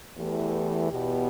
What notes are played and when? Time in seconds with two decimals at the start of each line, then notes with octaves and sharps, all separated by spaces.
0.16 E2 E3 A3 G4
0.90 E2 B2 B3 G4